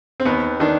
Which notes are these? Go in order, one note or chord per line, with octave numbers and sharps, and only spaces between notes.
C4
D#2 B3
D#3 D4